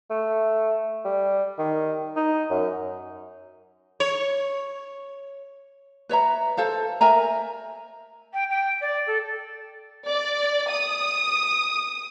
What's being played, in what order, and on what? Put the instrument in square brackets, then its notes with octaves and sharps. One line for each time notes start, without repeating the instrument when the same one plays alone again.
[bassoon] A3
G3
D#3
D#4
F#2
[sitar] C#5
[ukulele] B4 C#5 E5 A#5
A4 C5 F5
A#4 E5 G#5 A#5
[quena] G5
G5
D5
A4
[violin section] D5
D#6